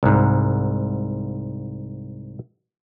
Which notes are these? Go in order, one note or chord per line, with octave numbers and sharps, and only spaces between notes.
C2 G#2